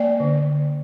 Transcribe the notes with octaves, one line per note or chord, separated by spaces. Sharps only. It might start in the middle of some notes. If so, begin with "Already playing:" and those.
Already playing: A#3 D5 G5
D3